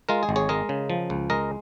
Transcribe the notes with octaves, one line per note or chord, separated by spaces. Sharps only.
G#3 F4 A#4
G#4
G#1
G#4 C#5
G#3 A#4 D#5
C#3
F3
C#2
G#3 A#4 D#5